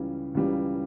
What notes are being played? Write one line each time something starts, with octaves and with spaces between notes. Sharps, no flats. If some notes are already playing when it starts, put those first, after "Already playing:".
Already playing: C#2 C#3 E3 G3
C#2 C#3 E3 G3